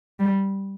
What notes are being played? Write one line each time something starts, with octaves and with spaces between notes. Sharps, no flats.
G3